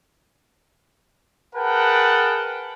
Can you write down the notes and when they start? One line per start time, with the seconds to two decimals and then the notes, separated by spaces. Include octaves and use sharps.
1.55 G#4 A#4 B4 F#5 G5 A5